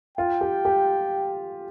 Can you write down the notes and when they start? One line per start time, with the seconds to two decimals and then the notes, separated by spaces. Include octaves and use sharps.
0.18 F4 G5
0.41 G4
0.65 G4